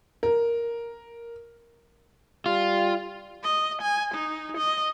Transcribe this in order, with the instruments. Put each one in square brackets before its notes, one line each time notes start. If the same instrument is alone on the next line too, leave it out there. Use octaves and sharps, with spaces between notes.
[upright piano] A#4
[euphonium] G3 [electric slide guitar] F4
[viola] D#5
G#5
D#4
D#5